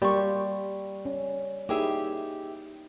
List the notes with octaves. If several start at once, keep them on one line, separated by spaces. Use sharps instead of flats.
G3 A#3 C6 C#6
C#4
A#3 D#4 E4 G4 G#4 E5